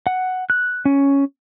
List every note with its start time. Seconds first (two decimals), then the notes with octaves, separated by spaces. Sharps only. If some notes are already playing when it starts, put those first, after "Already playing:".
0.07 F#5
0.50 F#6
0.85 C#4